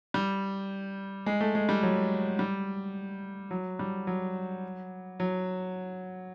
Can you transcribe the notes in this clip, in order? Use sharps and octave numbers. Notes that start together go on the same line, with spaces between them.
G3
G#3
A3
G#3
G3
F#3
G3
F#3
G3
F#3
F#3